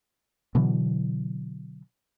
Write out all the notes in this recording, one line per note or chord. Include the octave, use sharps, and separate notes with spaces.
B2 D3 E3 F#3